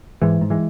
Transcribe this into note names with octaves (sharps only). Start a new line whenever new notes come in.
G#2 E3 G#3
G#2
E3 G#3